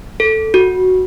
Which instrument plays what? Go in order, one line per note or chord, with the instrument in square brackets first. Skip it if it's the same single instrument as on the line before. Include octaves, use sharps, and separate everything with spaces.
[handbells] A4
F#4